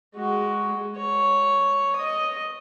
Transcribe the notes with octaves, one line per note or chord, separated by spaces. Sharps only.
G#3 F#4
C#5
D#5 D#6